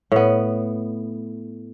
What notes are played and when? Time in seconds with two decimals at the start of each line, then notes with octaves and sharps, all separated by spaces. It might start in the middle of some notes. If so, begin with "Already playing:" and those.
0.12 A2 B3